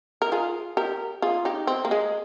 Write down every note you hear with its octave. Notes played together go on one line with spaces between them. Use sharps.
A#4
F4 G#4
G4 A#4
F4 G#4
D#4 G4
C4
A#3
G#3